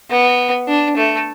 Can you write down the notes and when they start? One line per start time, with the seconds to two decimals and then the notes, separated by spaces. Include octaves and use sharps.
0.10 B3
0.68 D4
0.96 A3